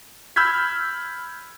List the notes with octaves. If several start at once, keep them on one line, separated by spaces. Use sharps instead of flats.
B5 E6 F6 G6 G#6 B6